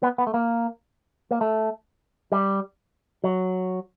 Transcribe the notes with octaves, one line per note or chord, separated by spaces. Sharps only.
B3
B3
A3
A#3
A#3
A3
G3
F#3